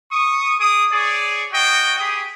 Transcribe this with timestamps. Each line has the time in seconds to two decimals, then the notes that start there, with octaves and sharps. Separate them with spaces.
0.12 C#6 D#6
0.59 G#4 D6 D#6
0.91 G#4 C#5 D5
1.52 F#4 C#5 D#5 G5
1.99 G4 G#4 B5 D#6